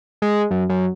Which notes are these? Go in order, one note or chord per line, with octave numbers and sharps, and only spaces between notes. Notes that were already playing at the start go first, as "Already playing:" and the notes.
G#3
F#2
F#2